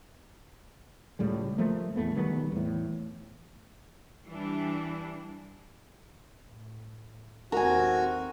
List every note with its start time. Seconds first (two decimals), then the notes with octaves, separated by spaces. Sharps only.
1.19 C#2 A2 G3 G#3
1.58 F3 A3 A#3
1.96 A1 E2 A3 B3
2.15 B1 D#3 G3 B3
2.52 E2 A2
4.26 E3 G3 D4
6.50 A2
7.52 D#2 C4 F#4 A#4 G#5